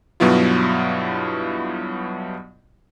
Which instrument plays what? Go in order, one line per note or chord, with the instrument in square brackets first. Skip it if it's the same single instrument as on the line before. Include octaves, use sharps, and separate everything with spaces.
[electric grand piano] G2 B2 F#3 B3 E4 F4